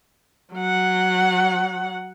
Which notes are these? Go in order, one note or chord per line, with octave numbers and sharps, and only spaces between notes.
F#3 F#5